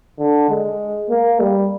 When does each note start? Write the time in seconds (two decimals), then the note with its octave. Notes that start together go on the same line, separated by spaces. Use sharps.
0.19 D3
0.50 G#3
1.09 A#3
1.40 G3